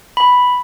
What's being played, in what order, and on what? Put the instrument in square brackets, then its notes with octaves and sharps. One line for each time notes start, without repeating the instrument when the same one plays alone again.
[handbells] B5